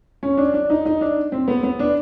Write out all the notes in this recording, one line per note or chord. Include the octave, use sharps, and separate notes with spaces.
C#4
D4
D4
D#4
D#4
D4
C4
B3
B3
D4